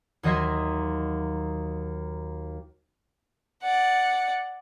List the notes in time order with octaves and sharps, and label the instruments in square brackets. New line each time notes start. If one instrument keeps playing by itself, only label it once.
[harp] D#2 F#3 D#5 E5 C6 G#6
[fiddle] D5 F#5